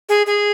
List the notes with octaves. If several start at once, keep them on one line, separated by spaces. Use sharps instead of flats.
G#4
G#4